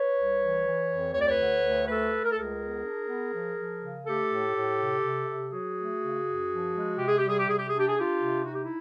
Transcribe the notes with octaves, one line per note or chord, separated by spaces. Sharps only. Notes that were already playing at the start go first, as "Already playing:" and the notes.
Already playing: B4 C#5
C2
E3
E3
F2
D2 C#5
D5
B4 C#5
D3
D2
A3 A4 B4
A3
A#4
A4
C#2 G#4 A#4
B3
D4
B3
F3
F3
C#3
A3 G4 A4
A2
A2
C3
C3
C3
F#3 F#4 G#4
A3
C#3
F#2
F3
G#3
C3 G4
G#4
G3 G4
G#4
G4
C3 G#4
G4
D4 G#4
G4
G#4
D4 F4 G4
C3
D#4 F#4
G4
E4